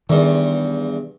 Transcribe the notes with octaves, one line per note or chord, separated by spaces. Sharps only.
E2 G2 D#3